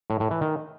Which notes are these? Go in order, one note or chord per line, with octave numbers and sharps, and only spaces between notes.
A2
A2
E3
D#3